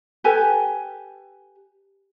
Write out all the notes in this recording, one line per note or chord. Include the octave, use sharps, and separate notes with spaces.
G4 A4 B4 G#5